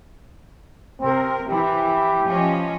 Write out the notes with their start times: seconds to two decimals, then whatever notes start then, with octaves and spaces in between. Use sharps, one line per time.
1.00 C3 C4 A#4
1.49 E3 E4 G4
2.26 F3 C#4 D#5